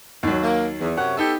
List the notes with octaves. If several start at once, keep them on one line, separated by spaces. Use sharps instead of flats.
D#2 F#3
A#3
E2
F#2 C3 C#5 F#5
B3 D#4 G4 A4